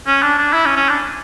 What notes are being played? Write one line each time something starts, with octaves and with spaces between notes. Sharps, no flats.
C#4
D4
D4
E4
C#4
C#4
D4